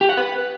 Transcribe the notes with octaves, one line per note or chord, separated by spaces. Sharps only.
G4
F#5
B4